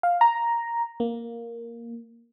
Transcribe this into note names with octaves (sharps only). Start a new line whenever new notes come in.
F5
A#5
A#3